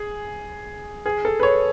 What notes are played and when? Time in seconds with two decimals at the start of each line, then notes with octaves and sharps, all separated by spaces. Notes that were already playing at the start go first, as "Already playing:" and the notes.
Already playing: G#4
1.06 G#4
1.25 A4
1.40 B4
1.43 C#5